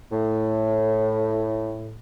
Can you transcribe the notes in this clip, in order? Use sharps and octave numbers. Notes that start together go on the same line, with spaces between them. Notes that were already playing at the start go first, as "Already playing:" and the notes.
A2